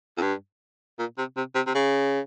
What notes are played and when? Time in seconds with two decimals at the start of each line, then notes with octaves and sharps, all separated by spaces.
0.18 F2
0.22 G2
0.99 A#2
1.18 C3
1.37 C3
1.55 C3
1.67 C3
1.75 C#3